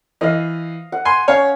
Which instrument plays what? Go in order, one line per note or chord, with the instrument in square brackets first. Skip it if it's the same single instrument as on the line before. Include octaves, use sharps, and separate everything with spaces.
[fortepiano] E3 [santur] D#5 F5
[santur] F#5
[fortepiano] G#5 C6
[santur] C#4 [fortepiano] C#5 F5